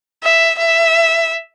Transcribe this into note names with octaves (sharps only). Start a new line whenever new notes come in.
E5
E5